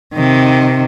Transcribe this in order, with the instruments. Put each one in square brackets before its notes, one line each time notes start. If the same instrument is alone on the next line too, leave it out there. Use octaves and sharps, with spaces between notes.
[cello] C3 D#3